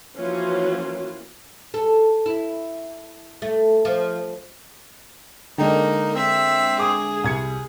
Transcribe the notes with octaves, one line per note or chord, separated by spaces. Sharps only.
E3 F3 A#3 C#4 F4 F#4
A4
E4
A3
F3
D3 G#3 A#3 D4 D#4 A4 D#5 G5
C4 E5
G#4 D6 D#6
C2 G#6 C#7